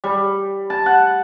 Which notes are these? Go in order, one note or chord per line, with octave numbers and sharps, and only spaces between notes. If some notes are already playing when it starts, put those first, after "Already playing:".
G3
A5
F#5